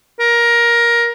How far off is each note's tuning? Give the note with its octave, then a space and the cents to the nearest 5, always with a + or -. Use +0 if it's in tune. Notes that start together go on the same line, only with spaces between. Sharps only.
A#4 +15